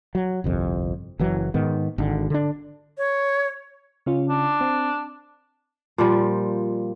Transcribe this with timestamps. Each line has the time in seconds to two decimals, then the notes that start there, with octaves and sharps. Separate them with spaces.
0.15 F#3
0.44 G1 C2 F2
1.19 F#1 E3 F#3
1.54 G#2 D#3 B3
1.98 G#1 D3
2.30 D3 D4
2.98 C#5
4.06 C#3 C#4 F4
4.29 D4
4.61 C4
5.98 A#2 F3 G3